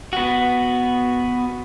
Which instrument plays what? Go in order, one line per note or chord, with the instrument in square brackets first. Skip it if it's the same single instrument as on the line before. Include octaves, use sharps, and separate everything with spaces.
[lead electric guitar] B3 F#4